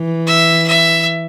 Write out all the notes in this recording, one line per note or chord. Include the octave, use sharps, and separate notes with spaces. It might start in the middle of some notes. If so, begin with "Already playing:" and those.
Already playing: E3
E5
E5